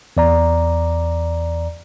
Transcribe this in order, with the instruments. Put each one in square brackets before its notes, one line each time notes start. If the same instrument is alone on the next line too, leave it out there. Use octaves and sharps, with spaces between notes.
[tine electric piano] E2 D5 A#5